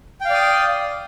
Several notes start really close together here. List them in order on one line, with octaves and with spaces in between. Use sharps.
G5 F5 D5 D#6